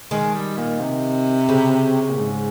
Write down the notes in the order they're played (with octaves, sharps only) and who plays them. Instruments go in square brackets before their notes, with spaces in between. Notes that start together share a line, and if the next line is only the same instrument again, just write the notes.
[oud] D#3 [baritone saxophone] G#3
[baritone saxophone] G3
A#2
C3
[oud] C#3
[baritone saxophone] C3
A#2
G#2